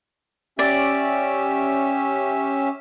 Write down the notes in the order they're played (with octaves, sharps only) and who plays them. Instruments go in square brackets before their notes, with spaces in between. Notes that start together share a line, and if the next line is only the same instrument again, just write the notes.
[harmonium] C#4 G4 E5 [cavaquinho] D5